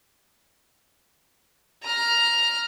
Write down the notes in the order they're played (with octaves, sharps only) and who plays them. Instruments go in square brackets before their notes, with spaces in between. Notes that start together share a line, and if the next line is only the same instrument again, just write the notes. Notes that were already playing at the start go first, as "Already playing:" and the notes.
[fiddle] A#5 F6